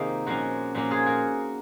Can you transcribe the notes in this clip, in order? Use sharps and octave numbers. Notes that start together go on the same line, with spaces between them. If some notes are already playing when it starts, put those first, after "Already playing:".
Already playing: C3 D#3 A#3 D#4 F4 G#4
A#2 F3 A#3 C#4 F#4
A#2 F3 A#3 C#4 F#4
F4 G#4
F#4 A#4